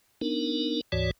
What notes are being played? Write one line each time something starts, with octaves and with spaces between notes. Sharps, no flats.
B3 D4 D#4 A#4
D2 G#2 E3 F#4 C#5 D5